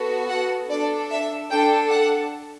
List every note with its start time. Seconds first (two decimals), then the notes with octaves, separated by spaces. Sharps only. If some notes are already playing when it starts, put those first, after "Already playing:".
Already playing: B3 F#4 A4
0.29 F#5
0.69 D4 A4 D5
1.10 E5
1.51 D4 A4 G5
1.91 F#5